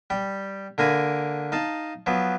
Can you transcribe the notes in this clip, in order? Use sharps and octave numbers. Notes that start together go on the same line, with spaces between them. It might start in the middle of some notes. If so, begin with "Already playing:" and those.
G3 G5
D3 A#3 A#4 G#5 B5
D#4 F5 A5
F3 F#3 B3